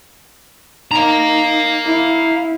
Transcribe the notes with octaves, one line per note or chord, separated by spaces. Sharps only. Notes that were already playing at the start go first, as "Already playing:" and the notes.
D#4 F5 A#5
E4